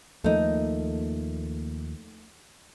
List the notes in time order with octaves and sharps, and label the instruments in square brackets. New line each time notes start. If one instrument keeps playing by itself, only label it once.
[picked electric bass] D#2 F3 A#3 [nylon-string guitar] A3 D#4